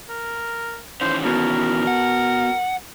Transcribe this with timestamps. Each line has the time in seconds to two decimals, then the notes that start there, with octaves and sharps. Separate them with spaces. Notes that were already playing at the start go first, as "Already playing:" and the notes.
0.09 A#4
1.01 D#3 E3 C#4 C5
1.25 B2 A#4
1.87 F#5